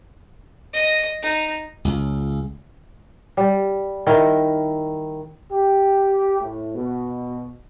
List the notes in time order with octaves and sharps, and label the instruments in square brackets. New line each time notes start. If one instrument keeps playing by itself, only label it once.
[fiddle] D#5
D#4
[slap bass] C#2
[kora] G3
D#3 E4
[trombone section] G4
A2
B2